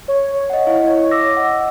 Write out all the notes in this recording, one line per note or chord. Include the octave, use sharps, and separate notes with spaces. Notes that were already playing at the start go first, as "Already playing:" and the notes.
C#5
D#5 F#5
E4 F5
D6 E6 A#6
D#5 F#5